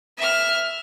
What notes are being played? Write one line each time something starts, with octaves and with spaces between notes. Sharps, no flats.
E5 F6